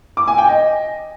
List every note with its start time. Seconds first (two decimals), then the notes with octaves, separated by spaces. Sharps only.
0.17 D6
0.28 G#5
0.38 G5
0.49 D#5